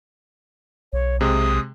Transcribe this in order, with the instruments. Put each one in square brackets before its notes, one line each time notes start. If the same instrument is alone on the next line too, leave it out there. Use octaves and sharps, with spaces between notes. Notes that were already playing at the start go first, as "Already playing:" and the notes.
[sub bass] B1 [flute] C#5
[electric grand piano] C3 G#3 [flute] D#6